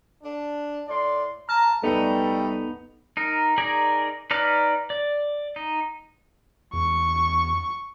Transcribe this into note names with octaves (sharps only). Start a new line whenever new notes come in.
D4
A2 D5 C6
A5 A#5 F6
C2 G3 A3 B3 D#4 A4
D#4 A#4
D#4 G#4 A#4 D5 G#5
D#4 B4 D5 A#5 F6
D5
D#4
E2 C#6